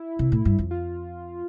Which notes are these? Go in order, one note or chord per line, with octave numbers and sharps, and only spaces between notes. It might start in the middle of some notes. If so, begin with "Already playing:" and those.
Already playing: E4
C3
A2
G2
F2
F4